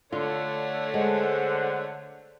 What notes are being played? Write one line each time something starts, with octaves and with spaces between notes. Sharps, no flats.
D3 A3 F4 C#5
G#3 C5 F#5